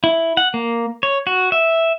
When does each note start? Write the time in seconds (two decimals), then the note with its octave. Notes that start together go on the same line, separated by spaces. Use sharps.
0.04 E4
0.37 F#5
0.54 A#3
1.03 C#5
1.27 F#4
1.52 E5